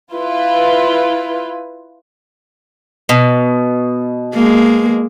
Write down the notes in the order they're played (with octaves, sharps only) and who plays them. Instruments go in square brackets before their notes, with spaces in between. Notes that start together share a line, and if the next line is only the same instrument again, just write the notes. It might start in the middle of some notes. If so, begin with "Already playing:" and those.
[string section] E4 F4 B4
[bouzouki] B2
[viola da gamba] G#3 A#3